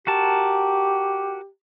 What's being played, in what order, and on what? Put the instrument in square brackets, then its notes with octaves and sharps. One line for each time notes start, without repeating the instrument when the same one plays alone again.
[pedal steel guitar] F#4 A#4 A5 [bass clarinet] G4